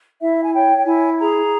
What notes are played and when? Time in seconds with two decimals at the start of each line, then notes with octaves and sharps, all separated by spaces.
0.20 E4 E5
0.43 G#5
0.53 C#5 G5
0.80 G5
0.86 E4 G#5
1.19 G#4 A#5